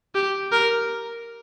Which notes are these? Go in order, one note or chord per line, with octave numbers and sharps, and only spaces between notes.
G4
A#4